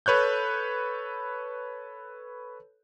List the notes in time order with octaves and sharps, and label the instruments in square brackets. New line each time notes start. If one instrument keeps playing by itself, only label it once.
[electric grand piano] A4 B4 C#5 F#6 G6